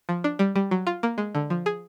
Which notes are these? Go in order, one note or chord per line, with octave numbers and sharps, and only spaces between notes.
F3
D4
G3
G3
F#3
F4
A#3
G#3
D3
F3
G#4